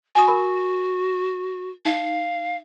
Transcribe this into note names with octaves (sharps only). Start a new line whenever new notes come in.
F#4 G#5 D#6
A#4 B5
D#4 F5